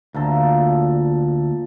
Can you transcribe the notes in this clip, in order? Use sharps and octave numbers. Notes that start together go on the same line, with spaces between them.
D2 A#2 A4